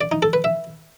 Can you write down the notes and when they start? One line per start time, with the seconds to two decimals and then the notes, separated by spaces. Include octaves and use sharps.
0.01 D5
0.12 D#4
0.22 A4
0.33 B4
0.44 E5